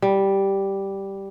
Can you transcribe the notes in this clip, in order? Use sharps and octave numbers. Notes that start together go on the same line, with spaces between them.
G3